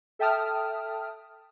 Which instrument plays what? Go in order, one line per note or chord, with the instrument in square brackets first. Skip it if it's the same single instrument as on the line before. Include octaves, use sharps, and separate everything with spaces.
[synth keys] A4 E5 G5 A5 D#6 F6